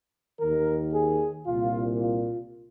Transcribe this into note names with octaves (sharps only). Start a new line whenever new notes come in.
D#2 D#3 A#4
G#4
C2 A#2 F4
F4